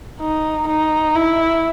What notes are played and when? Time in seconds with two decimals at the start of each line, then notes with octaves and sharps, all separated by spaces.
0.20 D#4
0.68 D#4
1.15 E4